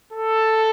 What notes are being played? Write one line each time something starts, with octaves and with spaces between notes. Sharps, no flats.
A4